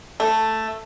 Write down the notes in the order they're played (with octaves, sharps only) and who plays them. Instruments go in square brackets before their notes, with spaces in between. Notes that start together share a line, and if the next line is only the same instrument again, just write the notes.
[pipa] A3